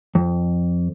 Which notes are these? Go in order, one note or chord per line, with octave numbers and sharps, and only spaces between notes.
F2